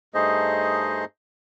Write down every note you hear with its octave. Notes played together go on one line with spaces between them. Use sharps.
G2 A3 D#4 G#4 C5 D#5